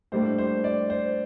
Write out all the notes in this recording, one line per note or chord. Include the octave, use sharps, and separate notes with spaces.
A2 G3 A#3 D4 C5
C5
D5
C5